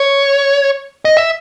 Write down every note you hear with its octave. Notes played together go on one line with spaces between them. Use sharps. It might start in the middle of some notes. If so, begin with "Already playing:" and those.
Already playing: C#5
D#5
E5